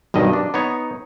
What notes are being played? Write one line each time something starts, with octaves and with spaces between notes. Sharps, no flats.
B1 G2 D#3 D#5
D4
B3 D#4 C#5